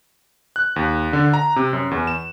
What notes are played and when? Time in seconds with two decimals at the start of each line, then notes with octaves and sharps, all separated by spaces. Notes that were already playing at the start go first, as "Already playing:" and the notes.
0.56 F#6
0.76 D#2
1.13 D3
1.34 A#5
1.56 C3
1.73 F#2
1.91 E2
2.07 E7